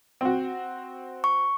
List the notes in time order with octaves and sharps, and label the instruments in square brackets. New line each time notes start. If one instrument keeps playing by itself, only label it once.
[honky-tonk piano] C4 F#4
[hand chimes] C#6